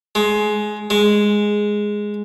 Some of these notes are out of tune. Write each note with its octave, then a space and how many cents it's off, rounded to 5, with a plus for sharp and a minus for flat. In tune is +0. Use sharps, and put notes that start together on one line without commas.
G#3 +20
G#3 +0